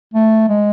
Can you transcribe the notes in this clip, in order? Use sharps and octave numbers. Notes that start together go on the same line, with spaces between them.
A3
G#3